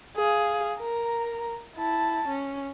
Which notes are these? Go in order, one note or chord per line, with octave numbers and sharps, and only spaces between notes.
G#4 F5
A#4 A#5
E4 A5
C#4